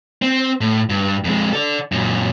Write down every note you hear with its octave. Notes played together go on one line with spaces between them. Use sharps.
C4
A2
G2
F2 G#3
A4 D5
F#2 A#2